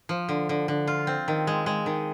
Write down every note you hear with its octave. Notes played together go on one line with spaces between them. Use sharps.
F3
D3
D3
D3
F4
C4
D#3
G#3
G#3
D#3